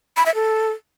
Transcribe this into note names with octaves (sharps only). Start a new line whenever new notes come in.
B5
E5
A4